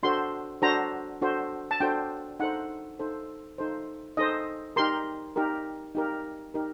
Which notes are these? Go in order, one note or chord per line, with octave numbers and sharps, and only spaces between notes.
D4 F#4 A4 C5 C6
D4 F#4 A4 C5 A#5
D4 F#4 A4 C5
A5
D4 F#4 A4 C5 G5
D#4 A4 C5 F#5
D#4 A4 C5
D#4 A4 C5
D#4 A4 C5 D#5
D#4 G4 A#4 C6
D#4 G4 A#4
D#4 G4 A#4
D#4 G4 A#4